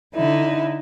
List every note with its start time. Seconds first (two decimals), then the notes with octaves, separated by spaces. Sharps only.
0.14 D3 D#4 E4